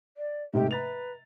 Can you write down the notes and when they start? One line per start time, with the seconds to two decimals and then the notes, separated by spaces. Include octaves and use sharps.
0.17 D5
0.54 G#2 C3 A3 G4
0.71 B4 A#5 A6 F7